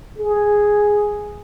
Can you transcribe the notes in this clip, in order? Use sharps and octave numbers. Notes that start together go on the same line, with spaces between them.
G#4